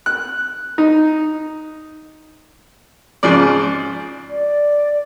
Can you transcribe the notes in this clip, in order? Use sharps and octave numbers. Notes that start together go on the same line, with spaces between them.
F#6
D#4
G#2 C#3 F3 D5
D5